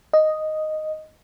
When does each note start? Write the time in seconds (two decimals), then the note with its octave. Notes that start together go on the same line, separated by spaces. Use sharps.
0.13 D#5